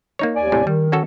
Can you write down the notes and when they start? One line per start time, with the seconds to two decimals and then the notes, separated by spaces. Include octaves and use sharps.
0.19 A#3 D#4 C#5
0.36 D#2 D5 G#5
0.52 A2 C3
0.67 D#3 G3
0.92 C#4 F#4 A4